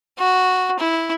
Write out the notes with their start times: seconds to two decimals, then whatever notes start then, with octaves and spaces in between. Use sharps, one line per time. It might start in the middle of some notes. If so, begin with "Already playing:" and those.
0.18 F#4
0.79 E4